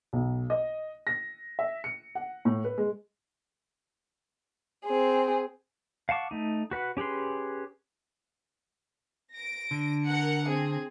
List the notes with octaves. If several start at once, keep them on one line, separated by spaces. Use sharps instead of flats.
B1
D#5
A#6
E5
C#7
F#5
A2
B4
G#3
C4 G#4
F5 F#5 A5 C#6 D6
A3 D#4
F#4 B4 F#5
C#4 G4 G#4 B4 C6
A#6 D7
D3
A#4 F#5 C#7
C4 G#4